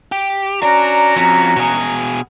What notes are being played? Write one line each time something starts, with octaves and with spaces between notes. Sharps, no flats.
G4
C#4 D4 F#4 D5 A#5
F2
B2 G#4